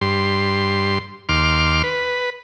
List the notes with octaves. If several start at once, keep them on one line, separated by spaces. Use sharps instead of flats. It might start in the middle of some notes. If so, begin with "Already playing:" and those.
G2 C6
D#2 C6 D6 F6
B4